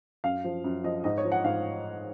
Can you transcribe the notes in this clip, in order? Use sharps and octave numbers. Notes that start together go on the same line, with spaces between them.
F#2 F5
F3
F#2
F3 D#5
G#2 D#5
C#5
F3
F#5
G#2 F5